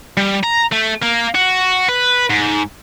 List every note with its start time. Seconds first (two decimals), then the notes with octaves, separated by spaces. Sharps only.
0.17 G3
0.43 A#5
0.72 A3
1.02 A#3
1.35 F#4
1.89 B4
2.30 G#2